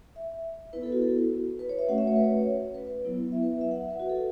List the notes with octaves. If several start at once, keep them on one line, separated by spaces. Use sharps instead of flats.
E5
B3 E4 B4
A4
F#4
A4
B4
C#5
E5
A3 C#4 F#4 F#5
E5
C#5
B4
C#5
B4
F#3 B3 E4
E5
B4
E5
F#5
E5
B4
F#4
A4